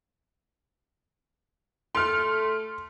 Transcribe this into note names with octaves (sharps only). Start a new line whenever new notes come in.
A3 C6 F6